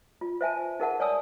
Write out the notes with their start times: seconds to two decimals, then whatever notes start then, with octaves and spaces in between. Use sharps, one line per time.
0.21 F4
0.41 C5 E5 G#5 A5
0.80 D#4 G#4 A#4 E5 F#5 A5
1.00 C#5 D5 G#5 A5 D#6 E6